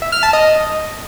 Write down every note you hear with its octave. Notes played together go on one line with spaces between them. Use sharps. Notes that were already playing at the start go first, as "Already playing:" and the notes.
E5
F6
A5
D#5